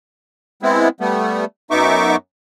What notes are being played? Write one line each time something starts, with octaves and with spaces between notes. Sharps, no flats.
G#3 B3 C4 E4
G3 A3 B3
F#2 B3 D#4 E5 C#6 D6